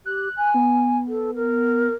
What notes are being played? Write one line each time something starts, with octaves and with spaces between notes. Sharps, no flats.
G4 F#6
G#5 F#6
B3
A4
A#4